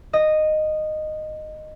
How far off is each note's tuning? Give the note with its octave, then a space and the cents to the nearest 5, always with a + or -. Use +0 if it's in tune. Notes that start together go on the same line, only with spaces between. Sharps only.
D#5 -10